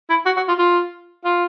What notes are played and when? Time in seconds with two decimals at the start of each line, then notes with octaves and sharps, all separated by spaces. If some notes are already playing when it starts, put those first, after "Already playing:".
0.10 E4
0.26 F#4
0.37 F#4
0.48 F4
0.59 F4
1.25 F4